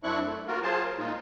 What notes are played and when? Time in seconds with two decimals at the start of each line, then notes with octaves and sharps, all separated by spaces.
0.03 F#2 C4 D4 E4 C#6 F#6
0.25 A3
0.47 A#3 F4 F#4 A#4
0.63 F#3 F4 G#4 C5 A5
0.84 A#4
0.98 A#2 G#3 D#4 F4